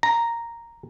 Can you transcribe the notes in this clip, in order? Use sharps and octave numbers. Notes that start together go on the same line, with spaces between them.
A#5